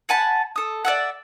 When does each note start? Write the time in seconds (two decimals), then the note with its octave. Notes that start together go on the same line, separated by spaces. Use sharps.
0.09 F#5 G#5 A5 B5
0.56 A4 D#6
0.85 D5 E5 F#5